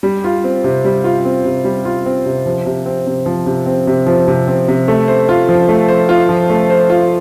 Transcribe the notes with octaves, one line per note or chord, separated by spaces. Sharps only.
G3
F4
C4
C3
G3
F4
C4
C3
G3
F4
C4
C3
F3
C3
C4
C3
F3
C3
C4
C3
F3
C3
C4
C3
A3
C5
F4
F3
A3
C5
F4
F3
A3
C5
F4